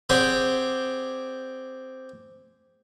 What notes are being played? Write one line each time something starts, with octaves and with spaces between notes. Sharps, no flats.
C4 G4 G#4 C5 D5 F#5